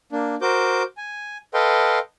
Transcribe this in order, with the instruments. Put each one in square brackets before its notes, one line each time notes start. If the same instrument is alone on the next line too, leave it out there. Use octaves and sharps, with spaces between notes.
[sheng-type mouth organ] A#3 D4
F#4 A#4 C5 D6 G6
G#5
A4 B4 D#5 F5 G5 C6